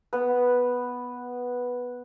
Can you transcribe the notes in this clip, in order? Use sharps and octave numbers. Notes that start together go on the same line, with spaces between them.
B3 B4